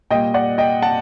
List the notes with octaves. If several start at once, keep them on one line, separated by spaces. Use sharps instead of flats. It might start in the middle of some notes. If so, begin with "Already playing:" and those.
A#2 G3 D#5 G5
D5 F#5
D#5 G5
F#5 A5